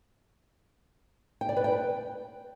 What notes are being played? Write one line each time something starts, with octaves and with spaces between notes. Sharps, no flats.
G5
D5
B4
G5